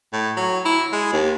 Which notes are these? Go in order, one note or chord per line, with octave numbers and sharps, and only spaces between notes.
A2
F#3
E4
G#3
D#2